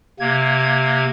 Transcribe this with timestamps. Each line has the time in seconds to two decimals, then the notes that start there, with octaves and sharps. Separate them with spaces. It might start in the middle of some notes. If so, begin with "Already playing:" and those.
0.20 C3 A#3 G#6